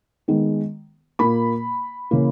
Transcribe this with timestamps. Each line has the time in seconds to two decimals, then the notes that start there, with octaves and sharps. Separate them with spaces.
0.28 D#3 G#3 B3
1.19 A#2 A#3 B5
2.11 C#3 E3 A#3